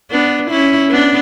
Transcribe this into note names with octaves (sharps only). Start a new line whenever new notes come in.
B3 D4
C#4 E4
B3 D4